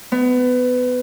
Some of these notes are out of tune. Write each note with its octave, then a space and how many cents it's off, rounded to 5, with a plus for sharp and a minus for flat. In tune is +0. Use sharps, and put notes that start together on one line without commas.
B3 +20